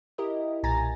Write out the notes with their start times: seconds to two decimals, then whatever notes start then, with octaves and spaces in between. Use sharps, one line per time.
0.18 E4 G4 A#4 D#5
0.63 B1 A#2 G#5 A#5 A6 A#6